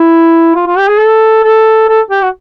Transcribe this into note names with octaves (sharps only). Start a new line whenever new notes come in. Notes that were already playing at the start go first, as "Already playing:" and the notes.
Already playing: E4
F4
F4
G4
G#4
A4
A4
A4
G4
F#4